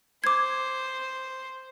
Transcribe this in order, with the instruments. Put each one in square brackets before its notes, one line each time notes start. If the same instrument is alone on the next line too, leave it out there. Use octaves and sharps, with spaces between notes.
[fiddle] C5 [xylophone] D6 G#6